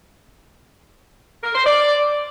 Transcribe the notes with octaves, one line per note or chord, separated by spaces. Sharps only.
A#4
C5
D5